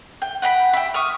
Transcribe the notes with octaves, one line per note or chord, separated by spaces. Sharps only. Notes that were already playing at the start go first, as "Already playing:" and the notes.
G5
F#5 G5 A#5 B5
G4 E5
C#6 D#6 F6